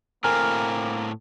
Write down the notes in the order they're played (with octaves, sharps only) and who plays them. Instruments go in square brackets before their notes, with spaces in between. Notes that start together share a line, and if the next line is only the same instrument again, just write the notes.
[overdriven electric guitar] A2 C4 [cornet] A#3 [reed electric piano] A#4 G#5 A#5 [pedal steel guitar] F6